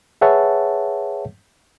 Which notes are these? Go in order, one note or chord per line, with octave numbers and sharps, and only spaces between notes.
G#4 B4 C#5 E5 F#5 A5